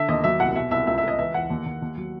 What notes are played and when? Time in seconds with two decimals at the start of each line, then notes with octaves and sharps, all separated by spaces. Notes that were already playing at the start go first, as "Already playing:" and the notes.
Already playing: D3 E5
0.09 D#2 D#5
0.24 F#3 E5
0.40 C2 F#5
0.56 B2 E5
0.71 C2 E5
0.87 C#2 E5
0.98 E5
1.03 C#2 D#5
1.19 E3 E5
1.34 E2 F#5
1.50 D#2
1.66 D#2
1.82 D#2
1.98 F#3